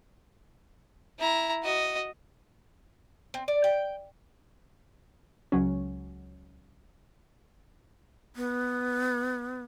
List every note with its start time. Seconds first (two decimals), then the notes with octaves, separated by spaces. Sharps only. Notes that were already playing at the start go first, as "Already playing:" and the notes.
1.19 E4 A#5
1.63 F#4 D#5
3.34 C4
3.48 D5
3.64 G5
5.52 C#2 F#3 C#4
8.36 B3